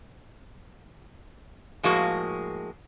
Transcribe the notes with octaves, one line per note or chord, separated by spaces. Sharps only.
A2 F3 G#3 A#3 F#4 G#4